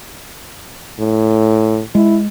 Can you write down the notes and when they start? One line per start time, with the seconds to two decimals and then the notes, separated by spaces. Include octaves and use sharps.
0.99 A2
1.95 G#3 E4